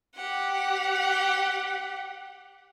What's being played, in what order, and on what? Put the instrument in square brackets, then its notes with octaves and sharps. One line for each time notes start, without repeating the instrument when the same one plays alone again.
[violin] G4 F#5